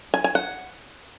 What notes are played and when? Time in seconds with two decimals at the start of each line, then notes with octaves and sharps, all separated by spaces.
0.14 G#5
0.24 G#5
0.35 F#5